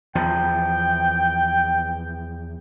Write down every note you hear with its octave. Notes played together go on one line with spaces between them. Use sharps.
E2 F3 G5